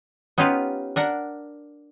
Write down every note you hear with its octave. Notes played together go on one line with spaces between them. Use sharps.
B3 C#4 D#4 F4 G4 B4
D4 A#4 F#5